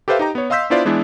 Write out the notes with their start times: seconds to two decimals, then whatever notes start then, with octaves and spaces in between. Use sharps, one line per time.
0.08 G4 A4 B4 C5 E5 F5
0.19 D#4 G4 A#5
0.35 B3 C#5
0.50 D#5 F5 C6 E6 G6 B6
0.70 B3 D4 E4 F4 C5 D5
0.85 E3 G#3 B3 D4 E4